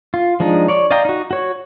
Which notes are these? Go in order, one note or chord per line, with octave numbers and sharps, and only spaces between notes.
F4
F3 G#3 D4 D#4
C#5 D5
D5 D#5 F5 G5 A#5
D#4 F#4
F#4 C#5